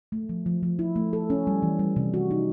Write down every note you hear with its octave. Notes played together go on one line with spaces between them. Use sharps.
A3
F3
F3
F3
E4
A3
A4
C#4
G3
E3
G3
C3
F#4
D#4